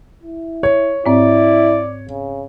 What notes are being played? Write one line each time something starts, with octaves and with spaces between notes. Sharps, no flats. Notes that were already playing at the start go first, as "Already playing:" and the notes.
E4
C#5
G#2 C4 E4 D5
C#3